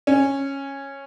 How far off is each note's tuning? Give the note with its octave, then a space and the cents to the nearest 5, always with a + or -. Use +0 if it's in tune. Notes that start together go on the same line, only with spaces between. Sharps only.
C#4 -10